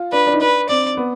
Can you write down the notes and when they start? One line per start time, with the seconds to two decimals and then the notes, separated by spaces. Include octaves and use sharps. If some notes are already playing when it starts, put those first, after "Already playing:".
Already playing: F4
0.12 D4 B4
0.27 D4
0.34 D#4
0.40 D4 B4
0.69 C4 D5
0.97 B3